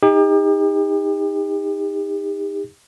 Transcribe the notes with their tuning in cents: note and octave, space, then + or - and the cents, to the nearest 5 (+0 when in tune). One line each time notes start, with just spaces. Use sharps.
D#4 +10 G4 +40